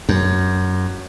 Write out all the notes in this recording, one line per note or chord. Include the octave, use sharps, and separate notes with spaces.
F#2